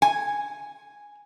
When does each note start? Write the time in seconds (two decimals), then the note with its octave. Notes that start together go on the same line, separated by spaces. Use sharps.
0.02 G#5